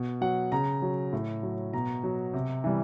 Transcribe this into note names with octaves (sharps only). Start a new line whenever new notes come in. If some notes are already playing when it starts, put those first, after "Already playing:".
Already playing: B2
F#3 F#5
C#3 A#5
F#3
A2
F#3
B2 A#5
F#3
C3
E3 G3